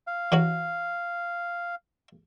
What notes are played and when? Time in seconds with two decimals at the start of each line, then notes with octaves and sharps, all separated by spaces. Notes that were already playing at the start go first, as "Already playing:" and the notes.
0.07 F5
0.32 E3 F#3 F#4